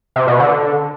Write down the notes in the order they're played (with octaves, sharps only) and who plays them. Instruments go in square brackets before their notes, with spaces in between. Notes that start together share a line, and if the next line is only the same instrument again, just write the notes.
[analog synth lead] C3
B2
D3